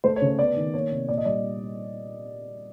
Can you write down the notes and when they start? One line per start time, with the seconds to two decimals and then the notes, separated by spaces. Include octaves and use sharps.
0.04 A3 C5
0.16 C#5
0.22 C#3
0.27 C#5
0.39 B3 D5
0.56 D#3
0.74 A#3 C#5
0.91 C3
1.09 A#2 D5
1.17 D#5
1.25 G3 D5